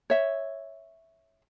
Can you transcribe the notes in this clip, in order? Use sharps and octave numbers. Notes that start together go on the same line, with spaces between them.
C#5 E5